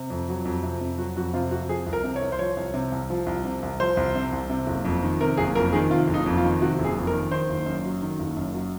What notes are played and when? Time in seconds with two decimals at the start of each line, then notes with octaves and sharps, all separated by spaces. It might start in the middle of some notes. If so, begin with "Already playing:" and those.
Already playing: C3
0.10 F2
0.29 F#3
0.45 F2
0.63 C3
0.81 F2
0.98 F#3 F#4
1.16 F2 F#4
1.33 C3 F4
1.51 F2 F#4
1.69 F3 G#4
1.86 C2
1.93 A#4
2.04 C3
2.16 C#5
2.21 C2
2.32 C5
2.39 F3 C#5
2.57 C2
2.74 C3
2.92 C2
3.10 F3
3.26 C2
3.45 C3
3.62 C2
3.80 F3 C5
3.97 C2
4.15 C3
4.32 C2
4.50 C3
4.67 F#1
4.85 F2
5.03 D#3
5.20 C3 A#4
5.37 F#1 G#4
5.55 F2 A#4
5.73 D#3 G#4
5.90 C3 F4
6.08 F#1
6.14 D#4
6.26 F2
6.37 F4
6.44 D#3
6.61 C3 F#4
6.79 F#1
6.84 G#4
6.96 F2
7.07 A#4
7.13 D#3
7.31 D#3 C5
7.49 F#1
7.66 F#2
7.84 F#3
8.02 D#3
8.19 F#1
8.37 F#2
8.54 F#3